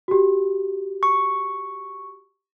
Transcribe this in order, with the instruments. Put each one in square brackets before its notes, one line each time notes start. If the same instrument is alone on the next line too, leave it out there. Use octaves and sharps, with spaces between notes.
[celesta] F#4 G4
[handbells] C#6